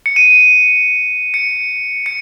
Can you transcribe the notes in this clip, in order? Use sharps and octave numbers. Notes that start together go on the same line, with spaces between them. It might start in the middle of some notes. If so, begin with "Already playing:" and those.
C#7
D#7
C#7
C#7